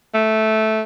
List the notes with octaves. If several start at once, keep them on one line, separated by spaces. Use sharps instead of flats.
A3